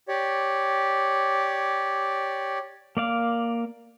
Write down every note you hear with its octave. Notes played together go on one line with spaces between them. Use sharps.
G4 C#5 D5
A#3 D5 F5